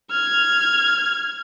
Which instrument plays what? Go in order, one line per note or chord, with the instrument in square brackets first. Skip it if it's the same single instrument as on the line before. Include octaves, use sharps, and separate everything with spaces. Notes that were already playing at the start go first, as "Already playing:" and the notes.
[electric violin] F6 G#6